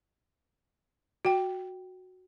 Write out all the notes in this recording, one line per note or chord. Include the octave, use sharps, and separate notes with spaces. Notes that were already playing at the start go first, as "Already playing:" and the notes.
F#4 G5